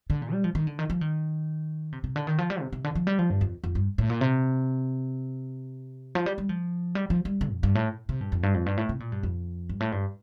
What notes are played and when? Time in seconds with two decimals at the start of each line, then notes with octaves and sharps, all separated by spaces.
0.10 D3
0.22 A#2
0.33 G3
0.44 F3
0.55 D#3
0.67 D3
0.79 D#3
0.90 F3
1.01 D#3
1.92 C3
2.04 C3
2.16 D3
2.27 D#3
2.38 F3
2.50 G3
2.61 C3
2.72 C3
2.84 D3
2.95 F3
3.07 G3
3.19 F3
3.30 G2
3.41 F2
3.64 F2
3.75 G2
3.98 A2
4.10 A#2
4.21 C3
6.15 F3
6.26 G3
6.38 G3
6.49 F3
6.95 G3
7.10 F3
7.25 G3
7.41 D3
7.52 F2
7.63 G2
7.75 A2
8.09 C3
8.21 G2
8.32 F2
8.43 G2
8.54 F2
8.66 G2
8.77 A2
8.89 C3
9.00 A#2
9.12 G2
9.23 F2
9.69 G2
9.80 A2
9.92 G2